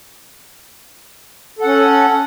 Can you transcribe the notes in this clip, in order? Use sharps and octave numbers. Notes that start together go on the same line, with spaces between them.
C#4 A4 F#5